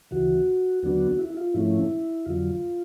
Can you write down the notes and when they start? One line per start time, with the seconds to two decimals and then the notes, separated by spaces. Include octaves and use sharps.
0.11 D2 C#3 E3 F#4
0.83 D#2 D3 F#3 B3 D4 F#4
1.19 E4
1.30 E4
1.37 F4
1.54 G#2 F3 A3 C#4 E4
2.26 F2 D3 F#3 F4